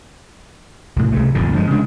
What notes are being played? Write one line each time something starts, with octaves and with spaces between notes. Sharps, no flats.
C2 A2
C2 C#3 A3
D1 F2 A#2 D3
G2 F3 F#3 G#3
C#3 G#3 D4